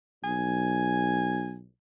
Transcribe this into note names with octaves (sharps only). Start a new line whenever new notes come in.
B1 G#5